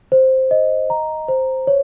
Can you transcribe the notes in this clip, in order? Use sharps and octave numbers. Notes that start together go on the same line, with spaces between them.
C5
D#5
A#5
C5
C#5